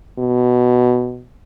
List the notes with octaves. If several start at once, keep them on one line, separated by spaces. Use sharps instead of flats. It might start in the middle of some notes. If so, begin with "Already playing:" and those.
B2